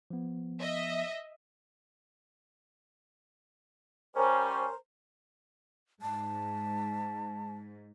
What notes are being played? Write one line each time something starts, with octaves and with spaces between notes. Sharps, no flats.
F3 B3
D#5 E5
G3 C#4 A#4 C5 A#5
G#2 A5